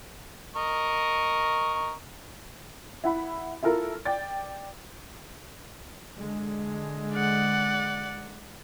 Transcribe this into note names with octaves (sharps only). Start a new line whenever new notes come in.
A#4 D#5 C#6
E4 F#5 B5
E4 F4 A4 A#4
D5 G5 A6
D3 G#3
D5 F#5